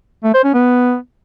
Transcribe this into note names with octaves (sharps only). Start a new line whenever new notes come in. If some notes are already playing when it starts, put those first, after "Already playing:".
A3
C5
C#4
B3